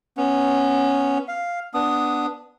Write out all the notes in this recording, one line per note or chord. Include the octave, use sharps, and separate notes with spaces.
B3 C#4
F5
B3 D4 D#6